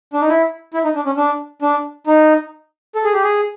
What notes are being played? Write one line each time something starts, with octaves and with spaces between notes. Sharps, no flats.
D4
D#4
E4
E4
D#4
D4
C#4
D4
D4
D#4
A4
G#4
G4
G#4